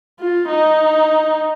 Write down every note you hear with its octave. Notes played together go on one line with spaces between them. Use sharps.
F4
D#4